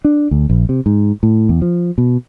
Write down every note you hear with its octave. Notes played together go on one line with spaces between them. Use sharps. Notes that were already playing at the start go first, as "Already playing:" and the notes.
D4
D2
A#1
C3
G#2
A2
E2
F3
B2